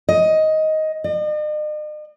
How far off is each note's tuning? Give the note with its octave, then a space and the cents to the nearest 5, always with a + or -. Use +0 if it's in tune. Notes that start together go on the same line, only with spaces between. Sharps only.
D#5 +10
D#5 -45